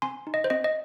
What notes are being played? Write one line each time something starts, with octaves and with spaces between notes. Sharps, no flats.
C4 G#5 C6
D#4
D#5
C5
C4 D#5
D#5